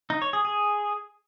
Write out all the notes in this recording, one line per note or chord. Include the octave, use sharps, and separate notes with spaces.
D#4
C#5
G#4
G#4